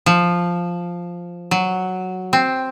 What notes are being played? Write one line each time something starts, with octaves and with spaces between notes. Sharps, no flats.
F3
F#3
C4